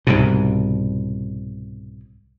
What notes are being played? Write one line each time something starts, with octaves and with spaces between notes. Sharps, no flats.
C2 G#2 B2